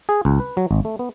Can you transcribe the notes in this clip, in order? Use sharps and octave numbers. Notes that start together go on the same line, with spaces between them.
G#4
C#2
B4
F#3
G#1
A3
B3